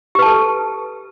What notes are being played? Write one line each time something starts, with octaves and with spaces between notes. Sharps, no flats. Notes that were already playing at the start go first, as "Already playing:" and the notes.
G4 A4 B4 A5